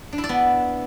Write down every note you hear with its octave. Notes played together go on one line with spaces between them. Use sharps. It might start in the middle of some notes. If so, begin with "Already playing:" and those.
D4
E4
D5
B3